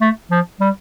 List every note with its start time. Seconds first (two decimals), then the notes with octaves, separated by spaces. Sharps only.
0.01 A3
0.31 F3
0.61 G3